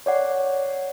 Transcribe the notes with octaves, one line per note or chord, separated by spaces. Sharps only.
C#5 D5 F#5